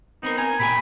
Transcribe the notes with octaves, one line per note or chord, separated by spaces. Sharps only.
B3 C4 D#4 A#4
A#4 G#5
A#2 G4 G#5 B5